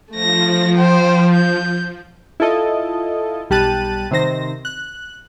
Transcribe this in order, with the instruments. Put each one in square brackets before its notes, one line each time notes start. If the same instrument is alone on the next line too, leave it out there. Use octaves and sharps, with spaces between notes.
[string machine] F3 [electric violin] A3 A#6
[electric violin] C5 G5
G6
[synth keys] E4 F4 A4 D#5
B1 G3 G4 A5 F#6 D#7
C3 D#3 C5 A#6
F#6